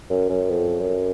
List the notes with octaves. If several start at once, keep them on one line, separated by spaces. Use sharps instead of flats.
F#2
F#2
F2
F#2